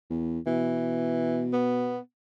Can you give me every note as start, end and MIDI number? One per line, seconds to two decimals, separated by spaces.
0.10 0.39 40
0.47 1.96 47
0.47 1.46 52
1.53 1.98 59